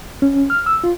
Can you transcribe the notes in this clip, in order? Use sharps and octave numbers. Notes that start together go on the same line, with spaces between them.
C#4
F6
E6
F4